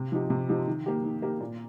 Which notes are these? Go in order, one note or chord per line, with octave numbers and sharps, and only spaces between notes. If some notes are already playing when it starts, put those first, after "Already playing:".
Already playing: C3
F3 D#4 G4
C3
F3 D#4 G4
D#3
A#3 G4
D#3
A#3 G4
A#2